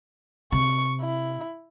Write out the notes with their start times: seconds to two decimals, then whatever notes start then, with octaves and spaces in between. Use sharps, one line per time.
0.52 C3 C#6
1.01 E4